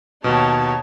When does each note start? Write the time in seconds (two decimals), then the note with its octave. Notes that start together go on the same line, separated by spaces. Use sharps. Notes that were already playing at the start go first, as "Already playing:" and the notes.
0.24 D#2 B2 D#4 C#5 A5